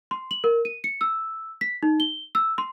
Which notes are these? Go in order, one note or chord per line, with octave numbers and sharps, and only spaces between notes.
C6
F#7
A#4
D#7
C#7
E6
B6
D#4
G7
E6
C6